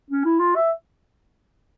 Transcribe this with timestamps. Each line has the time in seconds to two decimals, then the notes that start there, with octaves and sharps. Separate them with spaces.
0.10 C#4
0.25 E4
0.40 F4
0.55 E5